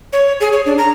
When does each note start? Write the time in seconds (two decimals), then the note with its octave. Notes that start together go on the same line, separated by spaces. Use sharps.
0.13 C#5
0.41 G#4
0.53 C#5
0.66 D4
0.78 A#5